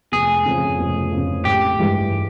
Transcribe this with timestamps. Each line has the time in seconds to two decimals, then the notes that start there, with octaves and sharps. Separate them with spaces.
0.12 F1 G#4
0.46 F2 C#3 F3
0.79 F1
1.11 F2 C#3 F3
1.44 A1 G4
1.79 G2 E3 G#3